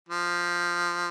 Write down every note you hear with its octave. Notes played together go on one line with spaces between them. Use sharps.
F3